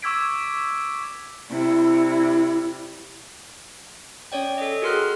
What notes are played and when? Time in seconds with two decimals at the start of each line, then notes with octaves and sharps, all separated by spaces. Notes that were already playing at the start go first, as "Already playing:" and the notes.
0.02 C#6 D6 E6 G#6 B6 D7
1.51 C3 G3 E4 D5
4.32 C#4 C#5 D5 G5
4.58 A4 D#5
4.82 F#4 G#4 A#4 C6 F6 F#6